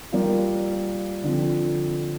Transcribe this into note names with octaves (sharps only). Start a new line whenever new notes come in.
G3 A#3 F4
D3 F3 C4